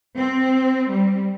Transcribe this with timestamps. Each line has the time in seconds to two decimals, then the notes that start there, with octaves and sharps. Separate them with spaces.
0.17 C4
0.90 G3